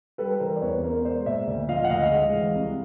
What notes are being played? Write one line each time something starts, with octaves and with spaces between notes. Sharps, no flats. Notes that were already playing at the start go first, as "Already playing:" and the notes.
G3 A4 B4
E3 A#4 C5
D5
E2 B4 C#5
B3 A#4 C5
G#3 C5 D5
A#2 D5 E5
D2
F3 D#5 F5
F#5
D2 D#5 F5
G#3
E3
C2